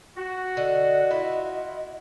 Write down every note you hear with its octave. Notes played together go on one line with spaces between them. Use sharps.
F#4
D3 D#5
E4 F4